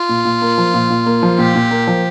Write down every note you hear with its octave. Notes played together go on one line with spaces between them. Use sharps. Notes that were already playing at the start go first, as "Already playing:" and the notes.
Already playing: F4
A#2
A#2
A#3
F3
A#2
A#2
A#3
F3
A#2 G4
A#2
A#3
F3